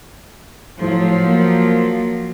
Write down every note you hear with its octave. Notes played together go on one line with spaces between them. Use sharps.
A2 F3 F#3
A#3